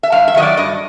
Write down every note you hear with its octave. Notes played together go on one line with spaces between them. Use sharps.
E5
G2 F5
E5
D#3 F#3 D#5
D5
G2 D#5